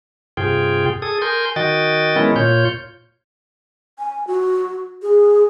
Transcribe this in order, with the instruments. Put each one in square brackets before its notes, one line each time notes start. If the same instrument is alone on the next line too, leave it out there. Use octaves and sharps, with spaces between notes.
[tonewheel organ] G2 C3 F4 G#4 G5
G#4 A4 D#6
A#4 G#5 C6 G6
D#3 F#4 D#5 G5 A6
D#3 G#3 B3 C#4 E4 A#4
A#2 F4 C#5 G6
[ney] G#5
F#4
G#4